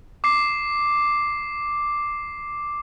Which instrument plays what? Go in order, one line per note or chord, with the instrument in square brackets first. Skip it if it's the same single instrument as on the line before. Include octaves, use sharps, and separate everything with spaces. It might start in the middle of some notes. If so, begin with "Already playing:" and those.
[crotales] D6 C7